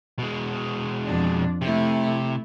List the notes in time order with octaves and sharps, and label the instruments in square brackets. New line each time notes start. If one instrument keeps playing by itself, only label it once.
[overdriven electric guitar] B2 G#3
[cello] F2 D4
[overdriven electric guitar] C3 [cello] A3 E4